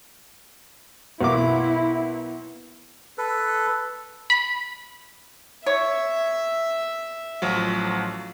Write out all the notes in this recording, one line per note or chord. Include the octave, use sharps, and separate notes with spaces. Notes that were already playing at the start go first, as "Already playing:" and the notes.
B1 A#3 E4 D6
A4 B4
B5
C#5 E5
A1 F3 F#3